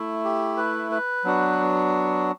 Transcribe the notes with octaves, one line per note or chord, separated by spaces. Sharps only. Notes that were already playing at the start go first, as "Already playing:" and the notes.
Already playing: A3 E4
G4
B4
B4
F#3 B3 D4 F#4